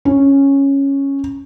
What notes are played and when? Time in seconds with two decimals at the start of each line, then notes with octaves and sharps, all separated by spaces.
0.05 C#4